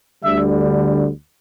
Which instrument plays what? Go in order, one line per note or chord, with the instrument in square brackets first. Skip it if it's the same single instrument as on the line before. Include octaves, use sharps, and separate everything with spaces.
[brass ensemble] D2 D3 G3 E5